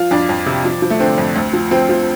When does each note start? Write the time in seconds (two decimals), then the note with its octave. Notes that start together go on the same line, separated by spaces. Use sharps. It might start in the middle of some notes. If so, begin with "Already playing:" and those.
Already playing: F3 F4
0.11 F2 D4
0.29 F2
0.46 C3
0.65 F3
0.82 F3
0.90 A3
1.00 D3 C4
1.18 F2
1.36 D2
1.53 F3
1.71 F3 C4
1.89 F3